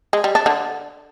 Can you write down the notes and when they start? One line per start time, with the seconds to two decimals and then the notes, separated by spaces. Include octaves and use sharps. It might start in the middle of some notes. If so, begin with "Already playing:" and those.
0.13 G#3
0.24 G3
0.35 D4
0.46 D3